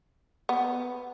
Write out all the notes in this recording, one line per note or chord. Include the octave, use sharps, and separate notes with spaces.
B3